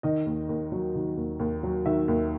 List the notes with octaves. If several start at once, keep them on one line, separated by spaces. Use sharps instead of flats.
D#3 D#5
D#2
D#2
F#3
D#3
D#2
D#2
F#3
D#3 E5
D#2